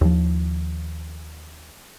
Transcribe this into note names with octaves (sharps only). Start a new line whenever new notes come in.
D#2 F3